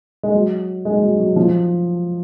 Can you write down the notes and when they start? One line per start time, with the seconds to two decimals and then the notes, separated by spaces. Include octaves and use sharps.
0.23 G#3
0.35 F#3
0.85 G#3
1.03 F#3
1.20 F#3
1.36 F3